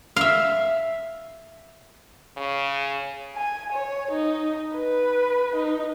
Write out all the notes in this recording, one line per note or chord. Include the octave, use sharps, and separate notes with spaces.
E5 F5
C#3
G#5
C#5
D#4
B4
D#4